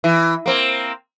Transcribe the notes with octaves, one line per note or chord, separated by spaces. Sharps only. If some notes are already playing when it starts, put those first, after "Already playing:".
E3
A#3 C4